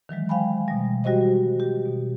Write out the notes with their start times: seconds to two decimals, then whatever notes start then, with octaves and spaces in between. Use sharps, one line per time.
0.09 D#3 E3 F#3 G#3
0.29 C5 F5 G5 G#5 B5
0.68 B2 G3
1.04 G3 F#4 G4 C5 D#5
1.60 G4
1.86 B2